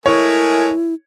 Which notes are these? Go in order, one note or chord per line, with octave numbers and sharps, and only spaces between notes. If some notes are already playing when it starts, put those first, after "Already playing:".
G#3 A3 E4 G#4 A#4 C#5